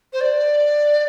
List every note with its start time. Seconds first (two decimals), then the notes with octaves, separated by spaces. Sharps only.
0.13 C5
0.20 D5